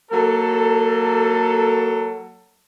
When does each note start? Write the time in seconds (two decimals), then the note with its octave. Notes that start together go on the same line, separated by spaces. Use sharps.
0.11 F#3 A#3 A4